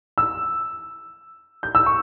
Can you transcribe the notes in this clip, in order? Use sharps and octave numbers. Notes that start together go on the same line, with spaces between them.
E6
G6
E6
C#6